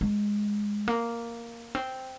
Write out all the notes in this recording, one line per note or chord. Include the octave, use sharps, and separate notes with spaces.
G#3
A#3
C4